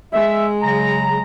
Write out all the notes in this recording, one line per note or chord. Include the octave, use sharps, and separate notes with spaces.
G#3 E5
C#3 F#3 A#5